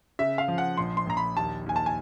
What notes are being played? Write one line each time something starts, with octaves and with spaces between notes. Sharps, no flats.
C#3 E5
F5
F3
F#5
A#1 C6
C6
A#1 A#5
B5
D#2 A5
D#2 G#5
A5
G#5